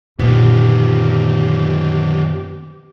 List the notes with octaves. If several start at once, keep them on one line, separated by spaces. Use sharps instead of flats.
F#2 A#2 D3 D#3 F3 B3 G4